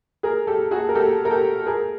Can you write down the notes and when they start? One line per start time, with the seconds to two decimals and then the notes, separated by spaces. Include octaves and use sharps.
0.23 G#4 A#4
0.47 G4 A4
0.71 F#4 G#4
0.89 A#4
0.95 G4 A4
1.25 A#4
1.30 G4 A4
1.66 G#4 A#4